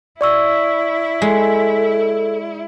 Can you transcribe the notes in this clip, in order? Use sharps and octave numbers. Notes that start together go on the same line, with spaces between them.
E4 D5 C#6 E6
G#3 A4